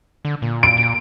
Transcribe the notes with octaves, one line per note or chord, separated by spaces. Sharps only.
D3
A#2
D7
A#2